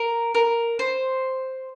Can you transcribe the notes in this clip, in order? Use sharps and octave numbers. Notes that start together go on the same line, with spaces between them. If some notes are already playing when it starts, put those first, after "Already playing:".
Already playing: A#4
A#4
C5